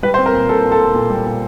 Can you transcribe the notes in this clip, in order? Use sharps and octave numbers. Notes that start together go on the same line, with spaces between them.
G3 B4
C5
C4
A#4
A#2
A#2 A4
A#2
A4
A#2
A#2
G3
A#2